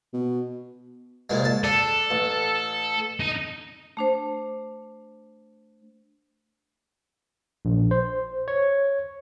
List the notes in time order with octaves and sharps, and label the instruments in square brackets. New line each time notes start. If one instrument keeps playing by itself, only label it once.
[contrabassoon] B2
[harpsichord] C2 A#2 G#3
A5
[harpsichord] D4 [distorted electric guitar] A4
[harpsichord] A1
[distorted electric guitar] D#4 A#5
[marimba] A3 D4 C5
[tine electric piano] A#1
C5
C#5